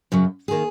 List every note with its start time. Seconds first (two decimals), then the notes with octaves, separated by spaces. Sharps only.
0.12 F#2 C#3 F#3
0.48 D#3 A#3 G#4